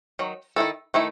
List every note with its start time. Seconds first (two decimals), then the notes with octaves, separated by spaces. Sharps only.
0.19 D#3 F#3
0.56 D#3 A3 E4 A4
0.94 D#3 A3 E4